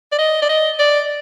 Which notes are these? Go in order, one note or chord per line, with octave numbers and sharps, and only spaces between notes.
D5
D#5
D5
D#5
D5